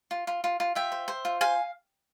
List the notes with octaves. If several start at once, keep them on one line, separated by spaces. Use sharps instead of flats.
F4
F4
F4
F4
F4 E5 G5
C5
C5
F4
C5 F5 G#5